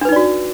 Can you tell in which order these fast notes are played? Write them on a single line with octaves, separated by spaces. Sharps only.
D4 B4 D#4 D5 F#4